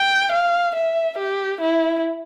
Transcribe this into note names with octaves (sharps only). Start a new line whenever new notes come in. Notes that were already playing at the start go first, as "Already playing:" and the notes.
Already playing: G5
F5
E5
G4
E4